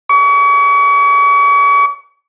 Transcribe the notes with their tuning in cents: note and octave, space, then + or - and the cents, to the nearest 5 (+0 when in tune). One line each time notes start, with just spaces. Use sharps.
C#6 +40